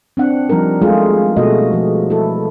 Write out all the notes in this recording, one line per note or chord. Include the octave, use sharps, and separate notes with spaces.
C4 D4 F#5
F3 G3 D#4 A#4
G#3 A3 F4 G#4
B2 A3 F#4 D#5
F3
E4 A4